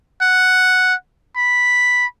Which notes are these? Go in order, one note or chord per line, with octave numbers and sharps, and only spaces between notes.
F#5
B5